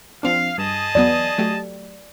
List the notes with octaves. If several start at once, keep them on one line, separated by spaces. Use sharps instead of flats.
F3 C4 D4 F5
G2 G#4 D#5 A5
E2 F#3 B3 D5
F#3 A3 G4